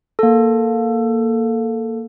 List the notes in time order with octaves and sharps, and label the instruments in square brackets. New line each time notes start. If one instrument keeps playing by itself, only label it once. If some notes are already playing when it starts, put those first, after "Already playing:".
[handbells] A#3 A4